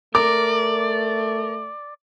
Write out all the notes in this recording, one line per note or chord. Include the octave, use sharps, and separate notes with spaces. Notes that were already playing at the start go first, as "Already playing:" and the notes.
A3 A#4 D5 D6